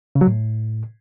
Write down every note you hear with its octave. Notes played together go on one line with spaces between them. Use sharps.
C#3
F#3
A2